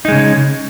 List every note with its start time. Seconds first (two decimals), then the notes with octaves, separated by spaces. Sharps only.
0.05 D#4
0.08 G#3
0.12 C#3